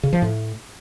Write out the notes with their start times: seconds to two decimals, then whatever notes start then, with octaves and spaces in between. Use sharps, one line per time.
0.03 C#3
0.13 F3
0.22 A2